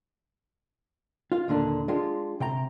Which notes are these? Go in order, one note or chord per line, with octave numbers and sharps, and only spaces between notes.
F4 F5
D#2 A#2 D3 D4
G#3 D4 F4 G4
C3 G5 A#5